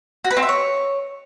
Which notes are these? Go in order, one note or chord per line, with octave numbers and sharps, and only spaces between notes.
F#4
B4
C4
E5
C#5